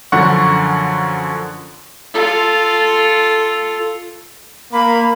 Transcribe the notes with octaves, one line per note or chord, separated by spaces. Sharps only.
F#2 D3 F3 F#5 C#6
F4 A4
A#3 B5